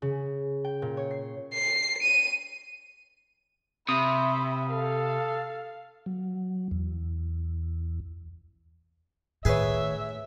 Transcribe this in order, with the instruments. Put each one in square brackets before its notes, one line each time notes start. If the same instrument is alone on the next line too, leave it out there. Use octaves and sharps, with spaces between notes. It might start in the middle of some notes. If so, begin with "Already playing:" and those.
[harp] C#3
G5
A#2
C#5
C7
[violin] C7
D#7
[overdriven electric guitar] C3 [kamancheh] E5 B5 [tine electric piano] D#6
[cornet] A4 [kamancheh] F5
[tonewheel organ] F#3
E2
[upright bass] A2 [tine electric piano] D#3 C#5 [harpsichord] G#4 B4 [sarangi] E5